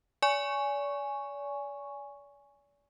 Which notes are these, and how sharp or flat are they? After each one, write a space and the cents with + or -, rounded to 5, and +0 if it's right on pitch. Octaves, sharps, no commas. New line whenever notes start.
D5 -40 G#5 +0 C#6 +0